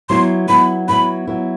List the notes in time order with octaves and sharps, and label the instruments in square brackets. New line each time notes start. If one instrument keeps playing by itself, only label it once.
[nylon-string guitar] F#3 B3 E4 [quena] C6
[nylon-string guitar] F#3 B3 E4 [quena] B5
[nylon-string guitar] F#3 B3 E4 [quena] B5
[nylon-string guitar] F#3 B3 E4